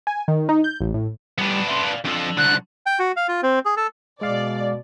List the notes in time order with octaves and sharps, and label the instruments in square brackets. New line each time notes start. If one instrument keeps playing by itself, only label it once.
[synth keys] G#5
D#3
D#4
G6
A1
A2
[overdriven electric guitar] A2 G3 [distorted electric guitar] B3 D4
[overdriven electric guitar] E5 C6
D5 F5
[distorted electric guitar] F2 F3 [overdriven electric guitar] D4 A4
[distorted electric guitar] C2 D3 [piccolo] F#6
[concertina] G5
F#4
F5
F4
C4
G#4
A4
[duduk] B2 [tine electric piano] G#3 F5 [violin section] D5